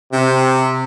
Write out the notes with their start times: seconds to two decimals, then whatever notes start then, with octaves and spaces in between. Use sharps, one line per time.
0.12 C3